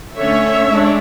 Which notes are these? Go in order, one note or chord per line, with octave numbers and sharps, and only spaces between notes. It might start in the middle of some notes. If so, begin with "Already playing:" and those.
D3 A3 C#4 C#5 E5
G#3 D4